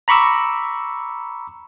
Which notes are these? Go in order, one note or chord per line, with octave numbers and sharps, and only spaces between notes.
A#5 B5 C#6 D6 E6